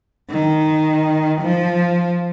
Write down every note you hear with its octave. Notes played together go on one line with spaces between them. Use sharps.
D#3
F3